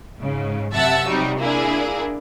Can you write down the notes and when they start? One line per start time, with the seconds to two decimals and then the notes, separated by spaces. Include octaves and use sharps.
0.18 G#2 C#3
0.73 F#2 C3 E5 F#5 A5 E6
1.07 C3 F#3 G3 D#4 F#4
1.38 A#3 D4 E4 G#4